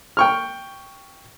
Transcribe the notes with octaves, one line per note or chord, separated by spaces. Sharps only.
G5 C#6 F6